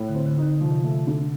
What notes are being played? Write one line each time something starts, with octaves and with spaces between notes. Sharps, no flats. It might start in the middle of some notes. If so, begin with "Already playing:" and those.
Already playing: A2
D3
C4
D3
D3 D#4
C3 F3
A3
D3